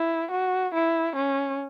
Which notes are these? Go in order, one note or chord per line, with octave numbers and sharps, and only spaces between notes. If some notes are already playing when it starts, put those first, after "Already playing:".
Already playing: E4
F#4
E4
C#4